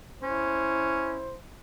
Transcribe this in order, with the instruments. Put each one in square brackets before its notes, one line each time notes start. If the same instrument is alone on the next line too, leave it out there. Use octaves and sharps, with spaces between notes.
[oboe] C#4 [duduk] E4 [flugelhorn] C5